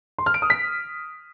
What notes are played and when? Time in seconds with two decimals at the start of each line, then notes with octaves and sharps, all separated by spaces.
0.18 C6
0.26 F6
0.34 D7
0.42 D#6
0.50 B6